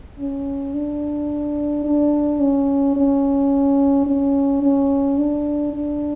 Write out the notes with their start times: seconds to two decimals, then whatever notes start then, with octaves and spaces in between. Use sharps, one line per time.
0.18 C#4
0.74 D4
1.84 D4
2.40 C#4
2.96 C#4
4.06 C#4
4.62 C#4
5.18 D4
5.73 D4